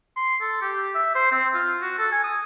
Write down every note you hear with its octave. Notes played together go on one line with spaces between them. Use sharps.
C6
A4
G4
E5
C5
C4
F4
F#4
A4
G#5
D#6